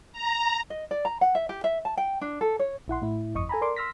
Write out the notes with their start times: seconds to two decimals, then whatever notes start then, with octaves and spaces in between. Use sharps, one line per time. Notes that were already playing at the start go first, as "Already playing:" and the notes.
0.13 A#5
0.70 D#5
0.91 D5
1.05 A#5
1.21 F#5
1.35 E5
1.49 G4
1.64 E5
1.85 A5
1.97 G5
2.21 D4
2.41 A4
2.59 C#5
2.88 A#1 E4 F#5 C6
3.02 A2 E4
3.34 G1 F2 D#5 C#6 D#6
3.49 A4 G#5 A#5 B5
3.61 A#4 D5 C6 D6
3.76 C6 E6 F6 A#6 B6